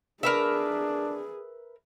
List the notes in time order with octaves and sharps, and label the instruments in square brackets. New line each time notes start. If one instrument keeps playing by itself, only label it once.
[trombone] D4 [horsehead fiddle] G#4 [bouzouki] A#4 B4 E5